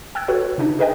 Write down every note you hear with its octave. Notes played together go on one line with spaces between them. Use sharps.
G5 E6 F#6 G#6
F#4 A4 B4 C#5
C#3 D4 D#4
G#4 A#4 B4 D#5 G5 G#5